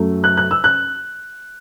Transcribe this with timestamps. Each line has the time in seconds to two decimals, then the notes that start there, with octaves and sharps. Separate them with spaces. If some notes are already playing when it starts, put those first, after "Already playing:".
Already playing: F#2 F#3 A3
0.24 F#6
0.37 F#6
0.51 E6
0.64 F#6